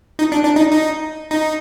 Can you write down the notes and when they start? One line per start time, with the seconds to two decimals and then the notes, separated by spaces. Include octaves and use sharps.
0.19 D#4
0.32 D4
0.43 D4
0.56 D#4
0.72 D#4
1.31 D#4